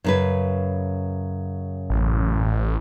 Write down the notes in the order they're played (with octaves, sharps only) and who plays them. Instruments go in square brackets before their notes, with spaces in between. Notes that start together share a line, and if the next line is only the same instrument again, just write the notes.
[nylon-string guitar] F#2 C#3 B4
[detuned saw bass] A1